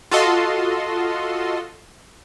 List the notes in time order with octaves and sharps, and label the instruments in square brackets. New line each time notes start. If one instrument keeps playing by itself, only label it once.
[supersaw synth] F4 F#4 A4 D#5 C6